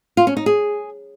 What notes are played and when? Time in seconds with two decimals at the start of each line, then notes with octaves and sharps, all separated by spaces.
0.17 F4
0.27 C#4
0.37 D#4
0.46 G#4